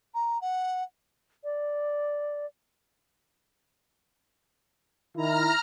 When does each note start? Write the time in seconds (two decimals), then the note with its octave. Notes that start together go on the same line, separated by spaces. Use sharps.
0.14 A#5
0.41 F#5
1.44 D5
5.17 D#3 E4 A#5 F6